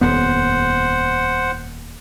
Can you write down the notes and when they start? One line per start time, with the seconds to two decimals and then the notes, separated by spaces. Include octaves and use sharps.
0.01 D#1 F2 B3 C5 F#5